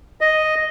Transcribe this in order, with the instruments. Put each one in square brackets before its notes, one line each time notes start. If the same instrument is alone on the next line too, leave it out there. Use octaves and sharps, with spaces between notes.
[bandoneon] D#5